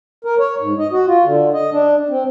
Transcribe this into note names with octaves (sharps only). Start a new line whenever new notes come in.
A#4
C#5
G#2
D#5
F#4
F4
D3
D#5
D4
C4